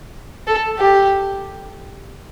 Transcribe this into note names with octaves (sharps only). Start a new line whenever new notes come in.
A4
G4